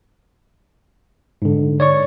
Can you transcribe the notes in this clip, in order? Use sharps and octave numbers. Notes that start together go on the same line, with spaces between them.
G#2 D3
C#5 D5 C#6